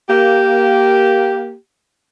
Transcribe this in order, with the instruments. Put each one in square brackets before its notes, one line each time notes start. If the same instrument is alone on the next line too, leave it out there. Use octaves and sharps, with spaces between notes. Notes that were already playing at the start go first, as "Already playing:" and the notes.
[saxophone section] A#3 G4